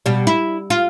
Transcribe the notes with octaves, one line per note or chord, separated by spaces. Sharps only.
B2 G3
E4
F4